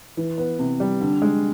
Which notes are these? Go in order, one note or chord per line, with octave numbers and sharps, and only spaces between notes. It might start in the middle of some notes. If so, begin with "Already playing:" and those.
E3
B3
C3
G3
D3
G#3